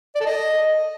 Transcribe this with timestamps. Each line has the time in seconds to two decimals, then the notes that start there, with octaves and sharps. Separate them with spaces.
0.15 D5
0.21 A4
0.26 D#5